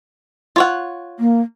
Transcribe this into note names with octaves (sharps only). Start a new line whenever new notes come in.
F4 C#5 F#5
A#3